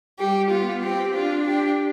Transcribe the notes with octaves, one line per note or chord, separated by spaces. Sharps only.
G3 G4
B3 F4
C4 G4
D4 F4
G4